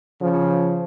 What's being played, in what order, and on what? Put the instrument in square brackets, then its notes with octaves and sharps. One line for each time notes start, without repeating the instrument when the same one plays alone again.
[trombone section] C#3 F3